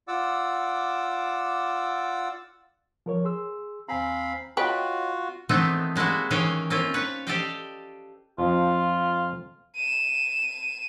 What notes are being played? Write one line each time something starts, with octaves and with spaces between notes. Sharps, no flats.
F4 D5 F#5 D6 E6
F3 A#4 C#5
G#4 C6 E6
D#2 C4 F5 G#5 A#5 B5
F4 F#4 B4 C#5 D#5 F#5 G5
D#3 E3 A3 B3 C4 D#4
G3 G#3 A#3 E4 F#4
D#3 E3 C#4 D#4 F5 G5
A#3 C4 C#4 F4
B4 C#5
G4 A4 D5 D#5 F5 G5
F2 F3 F4
D#7 E7